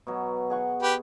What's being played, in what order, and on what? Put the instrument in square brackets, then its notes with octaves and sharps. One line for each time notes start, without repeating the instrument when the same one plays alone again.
[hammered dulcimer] B2 F#3
G#4 F#5 C#6
[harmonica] G4 B4